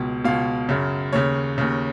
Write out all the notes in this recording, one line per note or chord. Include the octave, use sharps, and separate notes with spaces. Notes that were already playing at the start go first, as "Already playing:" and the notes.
Already playing: C#2 B2
C#2 B2 F5
F#2 C#3
D#2 C#3 C#5
D#2 C#3